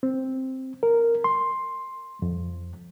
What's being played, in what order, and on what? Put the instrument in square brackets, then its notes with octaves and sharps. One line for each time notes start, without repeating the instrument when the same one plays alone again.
[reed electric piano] C4
A#4
C6
F2